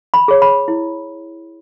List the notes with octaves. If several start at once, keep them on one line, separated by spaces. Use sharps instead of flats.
B5
G#4 C#5
B5
E4